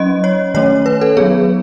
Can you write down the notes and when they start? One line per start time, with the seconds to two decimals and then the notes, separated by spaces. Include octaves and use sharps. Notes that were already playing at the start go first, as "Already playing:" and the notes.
Already playing: F#3 C#4 D#5
0.24 C#5
0.54 D#3 A3 C#4 C#5
0.86 B4
1.01 A4
1.17 F#3 B3 G#4